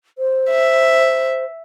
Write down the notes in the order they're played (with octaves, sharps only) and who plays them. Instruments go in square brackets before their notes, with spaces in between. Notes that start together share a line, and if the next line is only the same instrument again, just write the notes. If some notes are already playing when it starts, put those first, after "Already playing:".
[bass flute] C5
[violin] E5